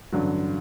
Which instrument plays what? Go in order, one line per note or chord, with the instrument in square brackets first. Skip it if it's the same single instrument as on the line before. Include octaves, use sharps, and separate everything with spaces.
[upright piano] A1 G2 D3 F#3